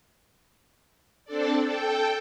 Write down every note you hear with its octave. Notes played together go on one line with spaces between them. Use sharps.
C4 D4 A4 D5
A4 G5